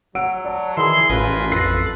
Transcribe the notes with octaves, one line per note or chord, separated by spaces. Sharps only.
F#3 F#5 E6 D7
D5 A5
D#3 E3 E4 G#4 C6
A1 F4 A#4 B4 G#5
F2 A4 F#6 A#6 C7